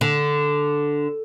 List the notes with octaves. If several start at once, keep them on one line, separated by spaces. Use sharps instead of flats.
D3